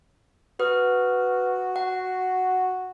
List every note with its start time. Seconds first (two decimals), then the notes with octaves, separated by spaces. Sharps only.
0.60 F#4 B4 D#6 F6
1.76 F#5